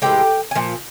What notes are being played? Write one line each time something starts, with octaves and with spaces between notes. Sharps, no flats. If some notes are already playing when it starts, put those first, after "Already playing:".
A2 E3 G#3 G4 G5
G#5
A#2 F3